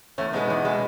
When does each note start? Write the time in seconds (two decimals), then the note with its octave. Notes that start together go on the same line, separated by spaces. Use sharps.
0.18 E2 A3 C#4
0.33 B2 G#3 B3 D#4
0.50 E2
0.65 B2 G#3